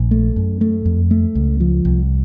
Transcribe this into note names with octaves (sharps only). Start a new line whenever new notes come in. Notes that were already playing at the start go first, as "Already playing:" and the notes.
Already playing: A#1
A3
F#2
A3
F2
A3
C#2
F3
C2